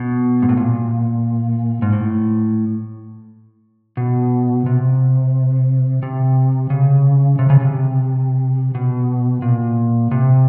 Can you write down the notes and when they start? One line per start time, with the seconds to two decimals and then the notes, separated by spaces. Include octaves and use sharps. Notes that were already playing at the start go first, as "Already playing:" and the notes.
Already playing: B2
0.42 G#2
0.49 A2
0.57 A#2
1.82 G#2
1.93 A2
3.97 B2
4.66 C3
6.03 C3
6.70 C#3
7.39 C3
7.50 C#3
7.60 C3
8.75 B2
9.42 A#2
10.11 C3